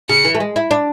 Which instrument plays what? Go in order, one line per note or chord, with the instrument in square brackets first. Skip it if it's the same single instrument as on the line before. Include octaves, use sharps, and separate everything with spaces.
[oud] C#3 [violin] C#7
[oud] E3
A3
G#3
E4
D4